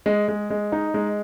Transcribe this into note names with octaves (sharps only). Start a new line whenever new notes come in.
G#3
G#3
G#3
D#4
G#3